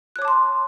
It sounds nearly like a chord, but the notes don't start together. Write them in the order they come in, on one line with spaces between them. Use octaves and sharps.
F#6 C#5 D6 A5 C6